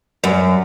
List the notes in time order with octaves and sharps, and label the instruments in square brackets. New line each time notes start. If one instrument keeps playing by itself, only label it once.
[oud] F#2